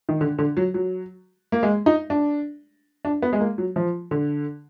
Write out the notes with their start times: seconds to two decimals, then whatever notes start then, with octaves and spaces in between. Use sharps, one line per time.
0.09 D#3
0.21 D3
0.39 D3
0.57 F#3
0.74 F#3
1.52 A#3
1.63 G#3
1.86 D#4
2.10 D4
3.05 D4
3.22 B3
3.33 G#3
3.40 A#3
3.58 F#3
3.76 F3
4.11 D3